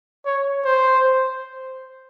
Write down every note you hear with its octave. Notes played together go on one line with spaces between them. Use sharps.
C#5
C5